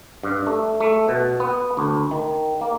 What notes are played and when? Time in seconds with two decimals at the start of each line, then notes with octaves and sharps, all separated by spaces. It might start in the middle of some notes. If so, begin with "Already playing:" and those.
0.23 G2
0.47 A3
0.80 A3
1.08 B2
1.40 B3
1.77 D2
2.11 D#3
2.61 A#3